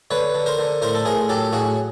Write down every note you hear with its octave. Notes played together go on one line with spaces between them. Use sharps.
D3 B4 C#5
D3
A#4 C5
D3
A2 A#4 C5
A4
A2 G#4 A#4
F#3 G4 A4
A2 F#4 G#4